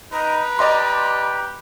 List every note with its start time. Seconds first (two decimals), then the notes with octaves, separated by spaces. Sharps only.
0.13 D#4 B4 A#5
0.59 G4 D5 D#5 C6